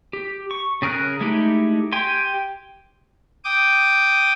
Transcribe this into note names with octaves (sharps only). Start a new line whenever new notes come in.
G4
C#6
C#3 G#4 A#4 F6 F#6
G#3 A3 D#4 E4 G4
G4 G5 G#5 C6
G5 D6 D#6